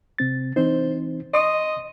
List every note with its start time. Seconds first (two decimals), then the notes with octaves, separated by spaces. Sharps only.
0.19 C3 C4 A6
0.56 E3 C4 D#4 C5
1.34 D#5 C6 C#6 D#6